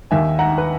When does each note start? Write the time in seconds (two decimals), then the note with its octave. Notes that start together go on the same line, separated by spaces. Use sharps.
0.11 D#2 D#3 E5 G#5
0.39 F#5 A#5
0.58 B4